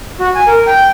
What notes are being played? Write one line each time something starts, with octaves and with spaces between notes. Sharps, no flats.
F#4
G#5
A#4
G5